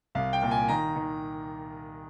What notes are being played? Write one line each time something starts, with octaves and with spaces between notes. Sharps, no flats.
C2 F5
G5
A#2
G#5
D#3 A#5
D#3